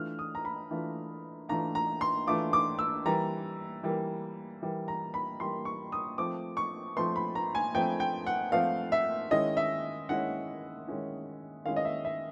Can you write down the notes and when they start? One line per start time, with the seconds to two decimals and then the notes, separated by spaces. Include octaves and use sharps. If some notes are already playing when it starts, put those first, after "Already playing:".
Already playing: E3 A3 D4 F4 F6
0.19 D#6
0.35 A#5
0.45 B5
0.71 E3 A3 D4 F4
1.49 E3 A3 D4 F4 A#5
1.75 A#5
2.01 C6
2.27 E3 A3 D4 F4 D6
2.53 D6
2.79 E6
3.05 E3 G3 A#3 A#5
3.83 E3 G3 A#3
4.62 E3 G3 A#3
4.88 A#5
5.14 B5
5.40 E3 G3 A#3 C6
5.65 C#6
5.92 D#6
6.18 F3 A3 C4 D6
6.57 C#6
6.96 F3 A3 C4 C6
7.16 B5
7.35 A#5
7.55 G#5
7.75 F3 A3 C4 G5
8.00 G5
8.27 F#5
8.52 F3 A3 C4 F5
8.92 E5
9.31 D#3 G#3 C#4 E4 D#5
9.57 E5
10.09 D#3 G#3 C#4 E4 F#5
10.87 D#3 G#3 C#4 E4
11.66 D#3 G#3 C#4 E4 F5
11.76 D#5
11.85 E5
12.05 E5